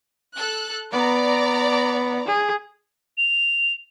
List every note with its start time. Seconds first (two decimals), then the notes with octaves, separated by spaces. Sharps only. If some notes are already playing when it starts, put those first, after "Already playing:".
0.36 A4 F#6
0.92 B3 D5 A#5
2.27 G#4
3.18 F7